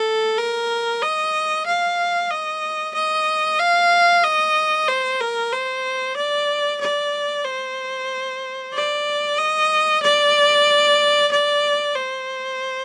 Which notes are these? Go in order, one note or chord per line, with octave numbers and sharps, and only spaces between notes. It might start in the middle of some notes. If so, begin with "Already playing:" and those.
Already playing: A4
A#4
D#5
F5
D#5
D#5
F5
D#5
C5
A#4
C5
D5
D5
C5
D5
D#5
D5
D5
C5